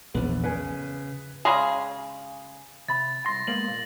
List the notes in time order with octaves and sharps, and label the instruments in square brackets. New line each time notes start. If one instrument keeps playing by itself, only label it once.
[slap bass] A#1 E2 [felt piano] B3
[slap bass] C#3 [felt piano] B4 G#5
[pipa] C#3 G3 G#3 G#4
[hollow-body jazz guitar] C3 B5 [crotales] A6
[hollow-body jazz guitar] C2 C6 [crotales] A#6
[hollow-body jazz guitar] G#3 A#3 B3 [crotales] F#7
[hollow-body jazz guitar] A#2